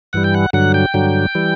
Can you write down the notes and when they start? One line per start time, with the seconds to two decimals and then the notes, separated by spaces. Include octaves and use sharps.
0.13 G2 E3 G3 F#5
0.24 G5
0.34 F#5
0.53 G2 D3 F#3 F#5
0.74 G5
0.94 G2 D3 F#3
1.35 E3 G3